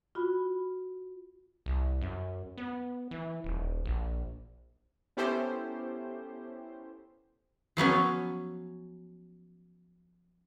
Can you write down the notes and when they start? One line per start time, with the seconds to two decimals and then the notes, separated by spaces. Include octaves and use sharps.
0.15 F4 F#4 B5
1.66 C2
2.01 F#2
2.58 B3
3.11 E3
3.44 D#1
3.86 A#1
5.17 B3 C#4 E4 G4 A4 C5
7.77 F3 F#3 B3 C#4